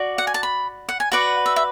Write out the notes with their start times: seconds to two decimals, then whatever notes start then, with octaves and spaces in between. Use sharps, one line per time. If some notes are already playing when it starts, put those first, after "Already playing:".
Already playing: F#4 D5
0.18 F#5
0.27 G#5
0.34 A5
0.43 B5
0.89 F#5
1.00 G#5
1.12 F#4 B4 D5 F#5
1.46 E5
1.56 E5